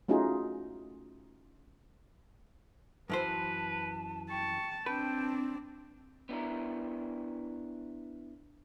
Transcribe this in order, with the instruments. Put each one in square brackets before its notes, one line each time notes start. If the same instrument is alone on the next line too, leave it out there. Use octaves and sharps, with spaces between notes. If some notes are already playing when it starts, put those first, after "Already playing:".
[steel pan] A3 C#4 D#4 F4 F#4 G#4
[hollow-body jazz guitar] F#2 E3 C5 [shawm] B4 [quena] A5
[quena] G5 [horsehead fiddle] A5 [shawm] C#6
[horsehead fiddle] C4 D4 [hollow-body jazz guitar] B4 [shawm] G5 [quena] A5
[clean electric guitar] B3 D4 E4 A#4